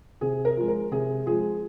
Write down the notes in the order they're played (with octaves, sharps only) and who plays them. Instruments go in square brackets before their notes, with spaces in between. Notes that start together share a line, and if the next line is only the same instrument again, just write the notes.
[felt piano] C3 G#4
A#4
F3 G#3
A#4
C3 G#4
F3 G#3 G#4